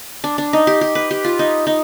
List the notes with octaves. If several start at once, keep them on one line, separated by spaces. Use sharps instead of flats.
D4
D4
D#4
G4
G4
B4
G4
F4
D#4
D#4